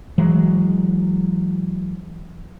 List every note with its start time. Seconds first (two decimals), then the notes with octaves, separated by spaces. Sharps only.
0.18 E3 F#3 G#3